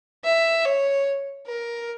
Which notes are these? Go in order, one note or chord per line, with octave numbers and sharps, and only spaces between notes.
E5
C#5
A#4